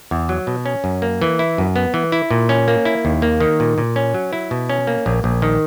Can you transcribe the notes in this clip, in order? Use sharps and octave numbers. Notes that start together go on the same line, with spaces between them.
E2
F#3
B2
C#4
F#2
A#3
E3
E4
F#2
B3
E3
E4
A#2
C#4
A#3
E4
D#2
A#3
D#3
A#2
A#2
C#4
F#3
E4
B2
C#4
A#3
A#1
A#1
D#3